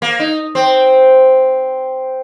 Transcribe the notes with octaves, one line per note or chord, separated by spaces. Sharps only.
A#3
D#4
C4